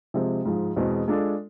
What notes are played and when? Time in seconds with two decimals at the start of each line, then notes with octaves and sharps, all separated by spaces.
0.14 C3 F3 G#3 C4
0.45 G#2 F3 G#3
0.76 E2 B2 G#3 C4
1.08 G#3 D4 F4 A4